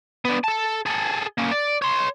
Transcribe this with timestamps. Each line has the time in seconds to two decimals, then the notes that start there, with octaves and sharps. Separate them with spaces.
0.25 B3 D4
0.44 A4 A5
0.86 G#4 A4
1.38 A#3 C#4
1.52 D5
1.82 C#5 C6